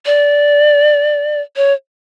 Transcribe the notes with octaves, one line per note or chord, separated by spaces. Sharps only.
D5
C#5